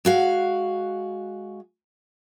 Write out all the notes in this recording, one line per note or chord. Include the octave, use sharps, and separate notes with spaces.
G#3 F#4 F5